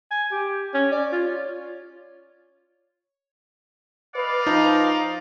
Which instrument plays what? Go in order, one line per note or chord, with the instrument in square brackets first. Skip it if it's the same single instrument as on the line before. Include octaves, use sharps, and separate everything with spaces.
[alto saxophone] G#5
G4
C#4
D5
F4
C#5
[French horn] B4 [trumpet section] D5 D#5 F5
[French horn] F3 [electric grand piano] D#4